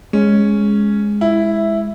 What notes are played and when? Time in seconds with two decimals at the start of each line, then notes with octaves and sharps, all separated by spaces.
0.13 G#3 C#4
1.21 E4